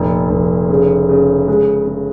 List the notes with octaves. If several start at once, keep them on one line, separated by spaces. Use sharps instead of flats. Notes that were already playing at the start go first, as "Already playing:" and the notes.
Already playing: F1 A#2
F1
C#3
C#3
G#3
C#3